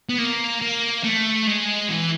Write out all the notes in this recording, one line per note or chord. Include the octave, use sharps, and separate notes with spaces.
B3
A#3
A#3
A3
G#3
E3